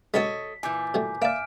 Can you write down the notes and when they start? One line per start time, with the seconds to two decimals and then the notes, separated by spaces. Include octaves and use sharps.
0.14 B2 D3 G#3 A4 C#5 D#5 B6
0.63 A#2 E3 G#5 D6 G6
0.94 B2 G3 A3
1.22 A#3 D5 E5 F6 D7